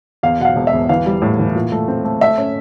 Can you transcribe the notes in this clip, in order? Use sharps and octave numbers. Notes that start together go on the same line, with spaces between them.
E2 F5
B2 F#5
F5
E1
E5
E2
E3 F5
G3
A2
E3
A#2
A3
C4
A3
A3 E5
C#4